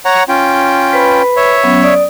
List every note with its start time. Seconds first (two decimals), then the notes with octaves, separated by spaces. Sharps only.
0.05 C#5 F#5 A#5
0.29 C#4 F4 G5
0.93 B4 C5 B5
1.37 C#5 E5
1.63 F#3 B3 C#4
1.83 D5 D#6